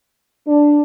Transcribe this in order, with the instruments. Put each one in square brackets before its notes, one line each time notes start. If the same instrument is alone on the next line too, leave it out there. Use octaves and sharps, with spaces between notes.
[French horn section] D4